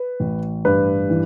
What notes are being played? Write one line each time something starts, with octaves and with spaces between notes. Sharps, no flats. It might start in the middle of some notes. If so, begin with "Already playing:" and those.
Already playing: B4
A1
G2 B4
E3